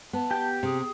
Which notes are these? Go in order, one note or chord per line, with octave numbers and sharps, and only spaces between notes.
B3 A5
G4 G5
C3 G#4